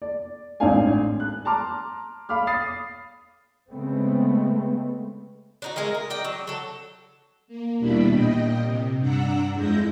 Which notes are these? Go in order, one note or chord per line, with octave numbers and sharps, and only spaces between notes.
D5
A1 G#2 C4 D4 F5 G#5
F#6
A5 A#5 C6 D6 F6
F5 B5 D6 F6
B5 D#6 A6 C7
C#3 G#3 A3 B3 C4
D4 D#4 F#4
G#3 A3 G#4 A#4
A#4
D5 D#5 G5
F#3
F#3 A4
A#3
D#2 B2 G3 D4 E4 B5
A#2 D#5 G5
C3
G2 D4 F#5 A#5 E6 F#6
F2 G#3 E4 G6 A#6